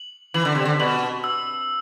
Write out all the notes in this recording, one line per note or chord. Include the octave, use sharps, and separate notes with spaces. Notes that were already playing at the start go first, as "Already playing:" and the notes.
Already playing: F#7
E3 F#7
D3
C3
D3
B2 F#7
E6